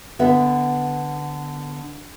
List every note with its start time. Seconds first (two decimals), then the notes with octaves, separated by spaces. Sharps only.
0.19 D3 B3 E5